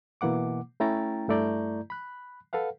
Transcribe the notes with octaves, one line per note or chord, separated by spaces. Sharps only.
B2 E3 A#3 F#5 D6
A3 C#4 E4 G5 A#5 A6
G2 A3 E4 D5 A#5 G6
B5 F#6
A4 B4 F5 F#5